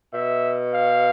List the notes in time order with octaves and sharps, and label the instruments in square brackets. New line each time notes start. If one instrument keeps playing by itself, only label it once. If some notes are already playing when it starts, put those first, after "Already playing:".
[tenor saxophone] B2 [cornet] E5
[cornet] F5